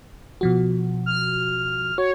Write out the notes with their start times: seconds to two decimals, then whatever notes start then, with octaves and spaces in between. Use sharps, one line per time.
0.41 B2 F3 F#4
1.06 F6
1.98 F#4 C#5